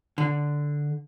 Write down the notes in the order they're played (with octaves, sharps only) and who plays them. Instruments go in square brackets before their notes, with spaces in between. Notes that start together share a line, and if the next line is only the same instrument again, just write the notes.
[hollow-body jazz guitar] D3